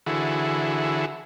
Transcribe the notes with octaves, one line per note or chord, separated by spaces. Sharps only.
D3 E3 E4 F#4 G#4 A4